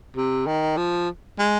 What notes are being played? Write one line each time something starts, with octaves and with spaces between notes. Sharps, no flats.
C3
D#3
F3
G#3